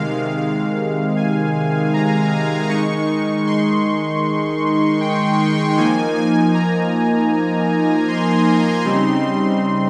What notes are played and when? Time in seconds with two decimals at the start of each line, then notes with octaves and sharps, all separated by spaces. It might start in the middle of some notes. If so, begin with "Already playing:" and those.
Already playing: C3 D#3 G#3 F5
1.16 G#5
1.94 A#5
2.69 D#3 G#3 D#4 C#6
3.47 C6
5.01 G5
5.77 F3 A#3 D#4 G#5
6.15 G#5
6.54 A#5
8.08 C6
8.85 C#3 G3 C4 D#4